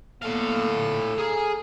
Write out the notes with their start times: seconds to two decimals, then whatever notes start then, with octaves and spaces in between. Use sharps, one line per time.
0.22 A2 A#3 B3 A4 F5
0.70 A#2 D3
1.18 G#4 G#5 A#5 F6